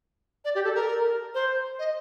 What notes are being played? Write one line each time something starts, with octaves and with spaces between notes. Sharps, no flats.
D5
G4
A4
A#4
C5
D#5